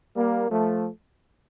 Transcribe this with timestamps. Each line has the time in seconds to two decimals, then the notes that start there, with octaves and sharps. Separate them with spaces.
0.15 G3 A#3
0.50 F3 A3